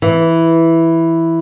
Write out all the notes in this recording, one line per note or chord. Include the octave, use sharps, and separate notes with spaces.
E3